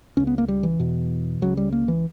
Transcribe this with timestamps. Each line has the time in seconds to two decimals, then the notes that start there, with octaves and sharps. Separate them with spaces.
0.17 C#2 C#3 C#4
0.27 B3
0.38 A#3
0.48 G3
0.63 E3
0.80 E2 B2
1.42 C#2 C#3 F#3
1.57 G3
1.72 A#3
1.88 E3